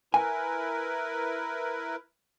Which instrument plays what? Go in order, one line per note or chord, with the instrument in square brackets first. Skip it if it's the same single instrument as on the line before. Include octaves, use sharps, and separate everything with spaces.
[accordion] E4 A#4 B4 [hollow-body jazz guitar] G#5